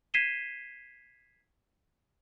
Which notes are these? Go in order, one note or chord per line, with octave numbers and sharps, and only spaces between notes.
G#6 B6 C7 D#7 E7 G7